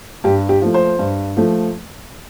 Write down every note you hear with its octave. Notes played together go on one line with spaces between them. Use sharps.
G2 G4
G4
F3 A3
C5
G2
F3 A3